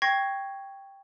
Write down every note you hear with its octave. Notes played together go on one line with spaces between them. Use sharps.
G5 C#6 G#6 A#6 C7